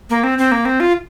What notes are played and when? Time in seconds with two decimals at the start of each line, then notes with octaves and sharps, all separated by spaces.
0.10 A#3
0.24 C4
0.38 C4
0.52 A#3
0.65 C4
0.80 F4